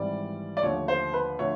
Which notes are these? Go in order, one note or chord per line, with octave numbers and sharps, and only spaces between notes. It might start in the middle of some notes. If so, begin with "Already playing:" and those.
Already playing: G#1 G#2 E3 G3 D5
D5
D#2 D3 F3 A3 C#5
C5
B4
D3 F3 A3 C#5